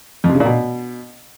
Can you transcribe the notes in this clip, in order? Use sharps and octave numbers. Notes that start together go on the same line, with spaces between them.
F2
C3
C#3
A#2
B2